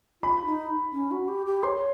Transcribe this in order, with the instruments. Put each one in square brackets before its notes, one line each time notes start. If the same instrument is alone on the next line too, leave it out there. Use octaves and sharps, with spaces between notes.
[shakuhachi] F4 [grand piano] B5
[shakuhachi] D#4
C#4
F#4
G4
G4
[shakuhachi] C#5 [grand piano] C6